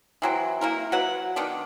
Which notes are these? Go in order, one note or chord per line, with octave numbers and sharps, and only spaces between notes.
E3 F#3 C4
A#3 E4 A#4
F#3 F#4 B4 F#5
D#3 B3 D4